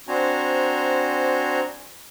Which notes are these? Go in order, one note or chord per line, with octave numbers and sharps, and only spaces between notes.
C4 D4 F#4 C5 G#5 A#5